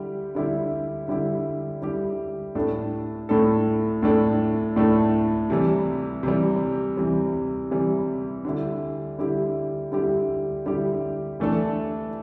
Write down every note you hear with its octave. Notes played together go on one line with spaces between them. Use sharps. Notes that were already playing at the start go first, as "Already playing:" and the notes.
Already playing: D3 G3 E4 G4
D3 G3 E4 G4
D3 G3 E4 G4
D3 G3 E4 G4
A2 A3 D4 A4
A2 A3 D4 A4
A2 A3 D4 A4
A2 A3 D4 A4
C3 E3 G3
C3 E3 G3
C3 E3 G3
C3 E3 G3
D3 G3 E4 G4
D3 G3 E4 G4
D3 G3 E4 G4
D3 G3 E4 G4
E3 A3 D4 A4